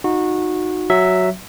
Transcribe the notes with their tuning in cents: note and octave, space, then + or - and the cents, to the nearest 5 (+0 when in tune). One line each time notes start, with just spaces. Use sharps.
D#4 +0 F#4 -20
F#3 +0 E5 +0